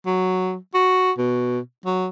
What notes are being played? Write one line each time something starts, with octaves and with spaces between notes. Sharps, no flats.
F#3
F#4
B2
F#3